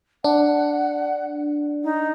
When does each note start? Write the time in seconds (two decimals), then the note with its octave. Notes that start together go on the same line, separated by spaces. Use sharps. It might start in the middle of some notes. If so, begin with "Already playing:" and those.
0.24 D4 F#5
1.84 D#4